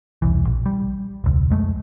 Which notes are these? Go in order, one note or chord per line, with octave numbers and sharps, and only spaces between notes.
E1 C2 E3
A#1
G3
E1 C#2
F2 G#3 A3